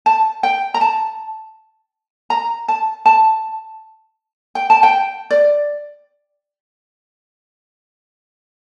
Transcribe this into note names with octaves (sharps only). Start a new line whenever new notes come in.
A5
G5
A#5
A5
A#5
A5
A5
G5
A5
G5
D5